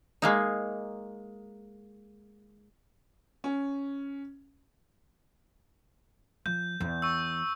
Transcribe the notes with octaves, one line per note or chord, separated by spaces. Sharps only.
G#3 A#3 D#4
C#4
F3 G6
E2
C#6 E6